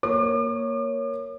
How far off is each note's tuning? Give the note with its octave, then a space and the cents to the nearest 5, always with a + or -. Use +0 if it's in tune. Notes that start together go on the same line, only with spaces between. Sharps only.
A#3 +0 C#5 +0 D6 +40